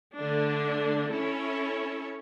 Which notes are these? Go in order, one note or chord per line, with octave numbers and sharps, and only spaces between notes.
D3 A3 D4
C#4 E4 A4 C#5